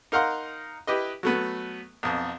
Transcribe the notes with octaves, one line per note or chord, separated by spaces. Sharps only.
D#4 A#4 F5 F#5 C6
E4 G4 B4 D#5
F#3 A3 B3
B1 F2